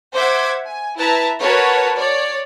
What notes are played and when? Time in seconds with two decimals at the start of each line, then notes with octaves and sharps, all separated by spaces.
0.14 C5 E5 F#5 D6 G#6
0.66 G#5
0.97 E4 B4 E5 A5 A#5
1.41 F#4 A#4 B4 C#5 A5
1.96 C#5 D5